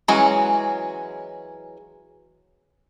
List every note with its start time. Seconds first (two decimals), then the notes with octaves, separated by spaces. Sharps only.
0.08 E3 F#3 G#3 C#4 F#4